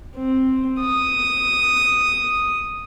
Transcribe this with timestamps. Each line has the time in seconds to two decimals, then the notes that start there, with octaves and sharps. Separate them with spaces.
0.17 C4
0.80 D#6